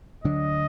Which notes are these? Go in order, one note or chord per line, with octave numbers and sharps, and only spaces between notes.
D2 D3 F#3 D4 D#5